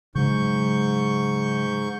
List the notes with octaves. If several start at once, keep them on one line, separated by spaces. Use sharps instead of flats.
G#2 C#3 F#3 G#3 C#6 G6